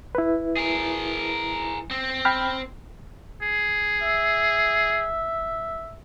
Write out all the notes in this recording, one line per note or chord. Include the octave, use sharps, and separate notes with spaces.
E4 B4
G#4 A#4
C4
G5 B5 F6
G#4
E5